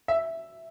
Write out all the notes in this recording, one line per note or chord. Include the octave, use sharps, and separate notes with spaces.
E5